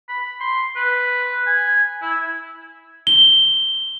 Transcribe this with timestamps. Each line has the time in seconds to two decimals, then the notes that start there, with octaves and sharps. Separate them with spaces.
0.09 B5
0.41 C6
0.76 B4
1.47 G#5
2.02 E4
3.07 G7